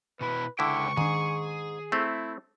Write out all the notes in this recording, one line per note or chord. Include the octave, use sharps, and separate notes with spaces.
B2 E4 B4
C#2 D3 E4 G5 C#6
G#2 D#3 D4 G#4
A3 C4 E4